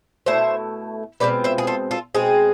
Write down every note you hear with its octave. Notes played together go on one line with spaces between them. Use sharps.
B2 A3 E4 C5 E5
B2 G#3 C4 F4 B4 D5
C5 E5
G#4
F4 A4
F4 A4
B2 G#3 C4 G#4